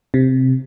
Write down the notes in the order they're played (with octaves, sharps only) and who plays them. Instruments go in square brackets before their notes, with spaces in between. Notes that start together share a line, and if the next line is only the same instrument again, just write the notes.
[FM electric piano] C3